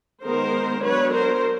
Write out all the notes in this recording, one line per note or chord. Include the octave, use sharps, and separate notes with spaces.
D#3 G#3 B3 A#4 C5
F#3 B3 D4 B4 C#5
A#4 C5